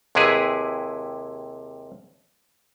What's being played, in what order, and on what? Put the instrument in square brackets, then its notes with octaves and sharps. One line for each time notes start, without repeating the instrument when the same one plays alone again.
[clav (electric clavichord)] D#2 C3 G#3 E4 G#4 B4